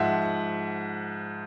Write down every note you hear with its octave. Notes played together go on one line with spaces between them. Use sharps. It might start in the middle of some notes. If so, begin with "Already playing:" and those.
Already playing: G#2 F3 E5 F#5